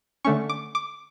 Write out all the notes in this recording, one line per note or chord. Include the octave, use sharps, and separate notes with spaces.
D3 A3 C#4 C#6
D6
D6